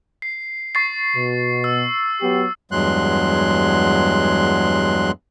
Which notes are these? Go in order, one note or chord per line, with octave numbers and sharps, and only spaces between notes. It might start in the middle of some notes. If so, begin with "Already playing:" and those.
C7
C#6 A6 C7
B2
E6
F#3 B3 G4
E2 G2 F#3 G#3 C6 F#6